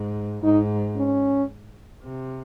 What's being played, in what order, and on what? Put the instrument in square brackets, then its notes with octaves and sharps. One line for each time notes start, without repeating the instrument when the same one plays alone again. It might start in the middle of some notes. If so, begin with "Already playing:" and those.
Already playing: [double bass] G#2
[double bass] G#2 [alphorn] D#4
[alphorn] C#4
[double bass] C3